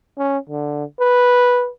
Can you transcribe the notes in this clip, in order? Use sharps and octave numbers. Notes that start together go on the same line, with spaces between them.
C#4
D3
B4